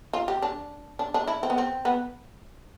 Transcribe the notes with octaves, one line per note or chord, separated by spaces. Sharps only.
F4
G4
D4
D4
D4
E4
C4
B3
C4
B3